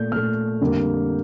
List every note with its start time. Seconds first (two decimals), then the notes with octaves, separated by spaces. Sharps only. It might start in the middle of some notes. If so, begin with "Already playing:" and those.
Already playing: A#2 A3 G6
0.12 A#2 A3 F6
0.61 F2 D3 G3 A#3